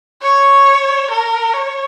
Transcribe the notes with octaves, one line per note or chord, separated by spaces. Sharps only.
C#5
A#4
C#5